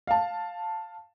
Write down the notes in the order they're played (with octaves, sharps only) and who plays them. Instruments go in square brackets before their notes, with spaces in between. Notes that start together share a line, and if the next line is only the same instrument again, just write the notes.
[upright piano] F5 A5